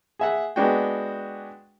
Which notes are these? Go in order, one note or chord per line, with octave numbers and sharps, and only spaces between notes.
G#4 E5 F#5
G#3 B3 D4 F#4 F#5 G5